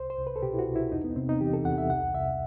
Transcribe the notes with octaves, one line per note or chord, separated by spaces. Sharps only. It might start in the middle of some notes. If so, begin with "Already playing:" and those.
Already playing: C2 C5
C5
C2
B4
A4
B2 G4
E4
F#4
C2
E4
E2 D#4
B3
C3 C4
D#4
E3 G4
A4
E2 F#5
E5
C2 F#5
C2 E5